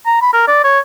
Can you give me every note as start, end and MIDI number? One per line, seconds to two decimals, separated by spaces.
0.06 0.21 82
0.22 0.32 83
0.33 0.46 70
0.48 0.59 74
0.64 0.79 73